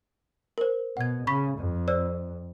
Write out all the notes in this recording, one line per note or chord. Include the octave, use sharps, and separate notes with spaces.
A#4 C5
B2 F#5 G#6
C#3 B5 C#6 B6
F2
C5 D5 E6